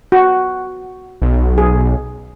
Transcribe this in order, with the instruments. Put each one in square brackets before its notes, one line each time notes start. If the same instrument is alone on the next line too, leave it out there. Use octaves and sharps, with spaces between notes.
[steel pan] F#4
[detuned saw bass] B1
[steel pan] G#4